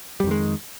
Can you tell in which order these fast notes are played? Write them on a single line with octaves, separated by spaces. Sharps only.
G3 F2 D#3 G#3